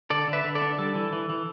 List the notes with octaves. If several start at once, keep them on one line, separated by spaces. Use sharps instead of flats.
D3 A4 D5
D3
B4 E5
D3
A4 D5
D4
G3 A4
E3
E3
E3